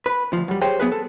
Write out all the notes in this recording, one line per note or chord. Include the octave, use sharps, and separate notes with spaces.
B4
D2 F3
F#2 G3
G4 G#4 C5 C#5 G5
F#3 B3 G#4 B4
A4